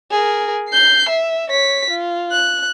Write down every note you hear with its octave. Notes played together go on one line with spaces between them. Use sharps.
G#4 A#4
G6 C7
E5
C#5 B6
F4
F#6